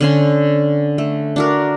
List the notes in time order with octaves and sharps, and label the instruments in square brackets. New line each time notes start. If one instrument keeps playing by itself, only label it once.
[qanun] D3 C#4 C6
A3
D4 F#4 A#4